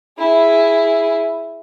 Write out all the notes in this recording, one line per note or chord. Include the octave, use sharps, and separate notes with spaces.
E4 G#4